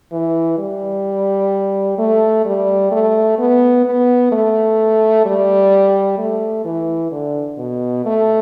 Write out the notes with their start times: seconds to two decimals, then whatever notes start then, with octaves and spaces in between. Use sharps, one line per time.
0.12 E3
0.58 G3
1.98 A3
2.45 G3
2.92 A3
3.38 B3
3.85 B3
4.32 A3
5.25 G3
6.18 A3
6.65 E3
7.11 D3
7.58 B2
8.05 A3